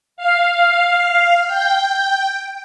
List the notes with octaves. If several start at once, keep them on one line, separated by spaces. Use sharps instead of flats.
F5
G5